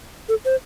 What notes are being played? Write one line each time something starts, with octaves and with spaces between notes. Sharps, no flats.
A4
C5